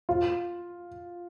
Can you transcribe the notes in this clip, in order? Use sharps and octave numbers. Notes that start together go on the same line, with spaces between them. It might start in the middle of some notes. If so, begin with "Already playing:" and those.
F4